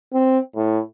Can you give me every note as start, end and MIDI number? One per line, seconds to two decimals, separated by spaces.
0.13 0.39 60
0.56 0.80 45